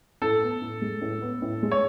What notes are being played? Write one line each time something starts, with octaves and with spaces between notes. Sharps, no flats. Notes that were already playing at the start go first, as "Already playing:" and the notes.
A2 A4
B3
A2
G#3
A2
B3
A2
G#3
C#5